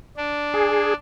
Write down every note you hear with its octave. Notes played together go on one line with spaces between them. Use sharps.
D4
G#4